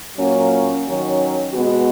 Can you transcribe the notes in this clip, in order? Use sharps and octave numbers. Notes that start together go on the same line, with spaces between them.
A#2 F#3 A#3 C#4
D#3 F#3 C#4
B2 G#3 B3 F#4